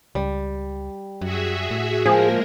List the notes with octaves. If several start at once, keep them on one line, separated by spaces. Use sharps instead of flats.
C#2 G3
F#2 F#4 G#4 E5
A2
F3 G#3 A#3 G#4 A#4